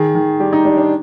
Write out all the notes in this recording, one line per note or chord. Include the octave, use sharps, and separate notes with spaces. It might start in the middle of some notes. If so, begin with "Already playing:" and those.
Already playing: D#3 G#4
D#3
G3 G4
D#4
G3 D4
D4